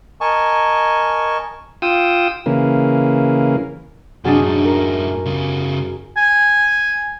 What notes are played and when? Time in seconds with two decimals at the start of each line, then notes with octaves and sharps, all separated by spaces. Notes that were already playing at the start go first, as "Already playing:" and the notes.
0.21 A#4 D#5 G#5 A5 C#6
1.82 F4 G5 D#6 E6
2.46 C#3 E3 A#3
4.25 F#2 C3 F#3 D4 F#4 G#4 D#5
4.42 F#2 A2 D#4
4.64 A#4
5.26 C#3 G3
6.17 G#5